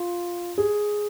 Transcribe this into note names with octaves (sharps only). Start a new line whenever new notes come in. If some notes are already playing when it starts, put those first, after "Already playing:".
Already playing: F4
G#4